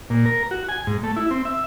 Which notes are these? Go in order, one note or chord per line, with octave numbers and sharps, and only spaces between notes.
A#2
A#4
F#4
G#5
G#2
A3
E4
C4
E5